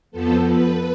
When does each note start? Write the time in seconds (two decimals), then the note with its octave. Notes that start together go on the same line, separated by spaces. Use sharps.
0.11 F2 F3 B3 A4
0.47 B4